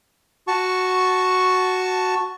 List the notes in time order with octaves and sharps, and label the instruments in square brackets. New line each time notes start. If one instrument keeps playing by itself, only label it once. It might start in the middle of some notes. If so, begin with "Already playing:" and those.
[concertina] F#4 A5 C#6